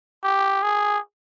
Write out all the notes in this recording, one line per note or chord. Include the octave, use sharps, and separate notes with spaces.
G4
G#4